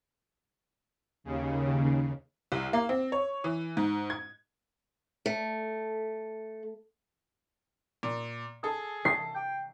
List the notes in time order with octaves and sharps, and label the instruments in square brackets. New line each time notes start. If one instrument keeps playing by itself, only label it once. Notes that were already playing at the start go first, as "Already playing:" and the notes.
[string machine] D#2 C#3
[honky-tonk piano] C2
A#3
C4
C#5
E3
G#2
G#6
[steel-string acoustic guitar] A3
[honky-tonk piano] A#2
[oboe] G#4 [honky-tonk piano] A4
[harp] C7
[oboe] G5